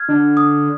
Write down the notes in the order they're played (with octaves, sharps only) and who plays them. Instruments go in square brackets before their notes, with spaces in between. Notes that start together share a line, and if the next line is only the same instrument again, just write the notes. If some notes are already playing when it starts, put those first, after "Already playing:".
Already playing: [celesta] F6 G#6
[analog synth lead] D3
[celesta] D#6